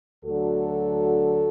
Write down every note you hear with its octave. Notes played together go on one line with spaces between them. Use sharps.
D2 D3 F#3 F#4 A4